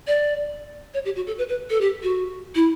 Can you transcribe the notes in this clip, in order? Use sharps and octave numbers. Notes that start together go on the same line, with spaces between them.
D5
C#5
G4
F#4
A4
B4
B4
A4
G4
F#4
E4